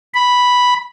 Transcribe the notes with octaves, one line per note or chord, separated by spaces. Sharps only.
B5